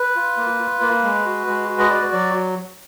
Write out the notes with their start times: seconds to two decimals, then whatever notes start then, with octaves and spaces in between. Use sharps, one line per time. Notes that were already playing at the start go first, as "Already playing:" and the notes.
Already playing: B4
0.16 F4
0.37 A#3
0.59 F4
0.81 A#3
1.03 G#3
1.25 F#4
1.47 G#3
1.68 F#4
1.79 D#5
1.90 F#4 D5
2.12 F#3 D5